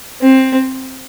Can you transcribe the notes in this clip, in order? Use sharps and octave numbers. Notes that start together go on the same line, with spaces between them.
C4